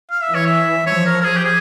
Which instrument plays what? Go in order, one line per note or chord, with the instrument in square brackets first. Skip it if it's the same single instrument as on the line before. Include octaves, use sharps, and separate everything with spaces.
[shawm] F5
E5
[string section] E3 [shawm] C#5
[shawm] E5
[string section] F3 [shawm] C#5
[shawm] A#4
A#4
G#4
G4
G#4